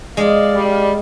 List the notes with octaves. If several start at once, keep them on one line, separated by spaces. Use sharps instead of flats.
G#3 D5 F5
G3